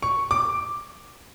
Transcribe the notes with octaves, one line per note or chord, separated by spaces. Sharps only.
C#6
D6